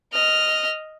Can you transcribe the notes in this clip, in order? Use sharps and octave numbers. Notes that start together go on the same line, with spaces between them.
D#5 F6